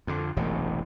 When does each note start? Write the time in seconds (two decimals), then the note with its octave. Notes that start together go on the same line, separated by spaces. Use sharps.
0.07 F2 D3
0.37 E1 A1 F#2 C3